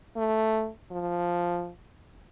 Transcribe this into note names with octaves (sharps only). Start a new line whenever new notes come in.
A3
F3